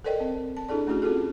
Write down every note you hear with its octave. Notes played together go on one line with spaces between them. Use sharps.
A4 A#4 C5 D5 D#5 G5
C4
A5
D4 E4 G#4 A4 D5
A3 C#4 E4 F#4 G#4
C4 F4 F#4 G#4 A4